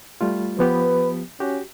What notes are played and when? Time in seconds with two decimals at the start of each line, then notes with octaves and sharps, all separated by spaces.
0.21 G3 A3 F4
0.59 F3 B3 G4 B4
1.40 C#4 F#4 G4